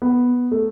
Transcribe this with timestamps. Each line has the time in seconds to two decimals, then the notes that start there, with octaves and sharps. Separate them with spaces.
0.02 B3
0.51 A3